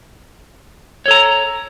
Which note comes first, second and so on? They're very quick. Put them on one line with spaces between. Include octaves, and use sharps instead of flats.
C#5 A4 A#5